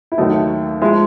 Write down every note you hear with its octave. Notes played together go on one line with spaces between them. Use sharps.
E4
D#2 D#3 F#3 A3 D#4
F3 G#3 E4